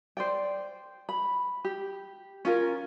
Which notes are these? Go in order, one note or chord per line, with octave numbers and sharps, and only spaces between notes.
C5 D5 G5
B5
G4
C#4 F4 A#4